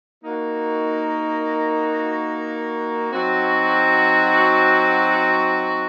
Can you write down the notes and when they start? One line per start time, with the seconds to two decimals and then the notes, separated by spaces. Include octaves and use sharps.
0.23 A#3 D#4 F#4
3.12 F#3 C4 D#4 F#4